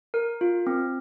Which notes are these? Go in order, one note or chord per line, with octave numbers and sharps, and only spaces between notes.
A#4
F4
C4